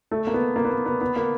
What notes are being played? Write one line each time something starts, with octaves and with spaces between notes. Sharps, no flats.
A3
A#3
B3
A#3
B3
A#3
B3
B3
A#3